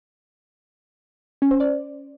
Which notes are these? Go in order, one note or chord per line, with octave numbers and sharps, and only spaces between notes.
C#4
C5
D5